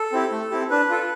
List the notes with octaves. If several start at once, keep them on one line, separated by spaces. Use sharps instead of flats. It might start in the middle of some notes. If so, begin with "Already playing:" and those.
Already playing: A4
C4 E4 G4
A3
C4 E4 G4
D4 B4
F4 A4